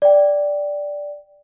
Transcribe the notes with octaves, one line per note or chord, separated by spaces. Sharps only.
D5 G5